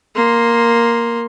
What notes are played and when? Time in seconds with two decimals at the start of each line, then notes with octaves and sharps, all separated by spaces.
0.15 A#3 C6